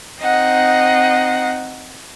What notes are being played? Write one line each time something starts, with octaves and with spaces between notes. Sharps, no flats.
C4 D#4 D#5 F#5